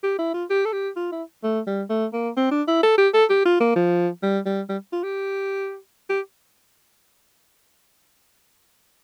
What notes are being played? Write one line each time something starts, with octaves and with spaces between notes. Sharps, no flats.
G4
E4
F4
G4
A4
G4
F4
E4
A3
G3
A3
A#3
C4
D4
E4
A4
G4
A4
G4
F4
A#3
F3
G3
G3
G3
F4
G4
G4